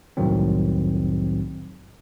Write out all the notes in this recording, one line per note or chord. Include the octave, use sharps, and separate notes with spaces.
C2 F2 A2 D#3 F#3 C4